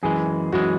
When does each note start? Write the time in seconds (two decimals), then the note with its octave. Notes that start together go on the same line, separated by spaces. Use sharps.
0.03 F#2 E3 G#3 G#4
0.52 F#2 E3 G#3 F#4